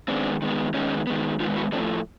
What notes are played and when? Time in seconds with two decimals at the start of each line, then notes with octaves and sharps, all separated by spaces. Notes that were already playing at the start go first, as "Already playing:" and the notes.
0.08 D#3 G#3 B3 C4 D4
0.42 D#3 G#3 B3
0.74 D#3 G#3 B3 C#4 D#4
1.07 D#3 G#3 B3
1.40 D#3 G#3 B3 D#4 F4
1.56 E4 F#4
1.72 A2 F3 A3 C4 D4